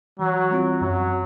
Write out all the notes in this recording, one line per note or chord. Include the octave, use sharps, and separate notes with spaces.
E3 F#3
G3 C4 F4
F#2 F#3